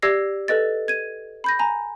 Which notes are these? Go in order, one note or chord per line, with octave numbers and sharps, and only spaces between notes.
G4 D5 E6 G#6 A#6 C7
A4 B4 D#5 A6
G#6 D#7
B5 G6 A#6
G#5 A#5